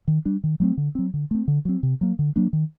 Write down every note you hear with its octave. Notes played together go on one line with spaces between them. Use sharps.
D#3
G3 D4
D#3
F#3 A3 C4
D3
F#3 C4
D3
A3 C4
D3
F#3 C4
C3
F#3 A#3
D3
F#3 A#3 D4
D#3